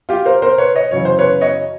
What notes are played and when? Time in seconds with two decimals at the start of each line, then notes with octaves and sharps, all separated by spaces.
0.09 F4 G4
0.25 A#4 C5
0.42 A#4 C5
0.58 B4 C#5
0.75 C#5 D#5
0.91 F#2 C#3 E3 C#5
1.05 C5
1.19 B4 C#5
1.41 C#5 D#5